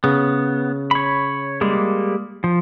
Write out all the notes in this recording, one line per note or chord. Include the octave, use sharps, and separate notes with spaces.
C#3 B3
C#5 B5
G3 G#3 A#3
F3